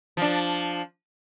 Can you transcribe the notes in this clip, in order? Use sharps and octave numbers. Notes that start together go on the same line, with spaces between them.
F3 D4